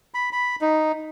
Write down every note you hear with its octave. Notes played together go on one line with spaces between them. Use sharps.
B5
B5
D#4